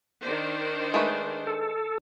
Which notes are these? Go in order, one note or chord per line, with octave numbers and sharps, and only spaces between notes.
D#3 D4 C5
G#3 A3 B4
A4